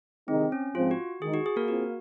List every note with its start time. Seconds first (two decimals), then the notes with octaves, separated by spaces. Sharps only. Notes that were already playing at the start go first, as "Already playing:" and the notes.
0.28 C3 D#3 G#3 C4 D#4
0.52 C#4
0.75 G#2 F3 C4 F4
0.91 F#4
1.22 D#3 G#3 D#4 G#4
1.34 F#4
1.46 G#4
1.56 A#3 A#4
1.68 C4 F4 F#4